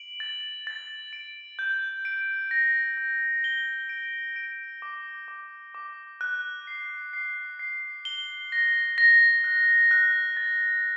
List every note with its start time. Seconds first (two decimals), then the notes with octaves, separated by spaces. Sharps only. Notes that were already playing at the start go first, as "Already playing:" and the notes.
Already playing: D7 F#7
0.20 A6
0.67 A6
1.13 D7
1.59 G6
2.05 D7
2.51 A#6
2.98 G6
3.44 G7
3.89 D7
4.36 D7
4.82 D6
5.28 D6
5.75 D6
6.21 F#6
6.67 C7
7.13 C7
7.59 C7
8.05 G7
8.52 A#6
8.98 A#6
9.44 F#6
9.91 F#6
10.37 A6